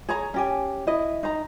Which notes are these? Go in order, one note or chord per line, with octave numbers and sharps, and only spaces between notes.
G#4 C#5 A#5
C#4 G4 G#5
E4 D#5
D#4 A#5